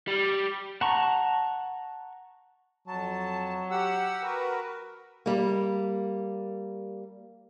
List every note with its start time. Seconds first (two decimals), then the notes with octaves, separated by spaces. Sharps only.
0.07 G3
0.81 F#5 A5 A#5 C#6
2.87 F2 F#3 A5
3.71 G4 F#5 E6
4.22 F#4 A#4 B4
5.26 G3 A#3